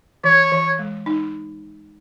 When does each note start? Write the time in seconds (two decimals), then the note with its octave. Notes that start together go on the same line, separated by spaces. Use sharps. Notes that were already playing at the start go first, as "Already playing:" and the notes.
0.24 E3 C#5
0.52 E3
0.79 G#3
1.06 D#4